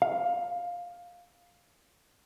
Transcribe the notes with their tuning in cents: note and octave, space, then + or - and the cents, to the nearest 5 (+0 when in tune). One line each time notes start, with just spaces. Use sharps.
F5 +10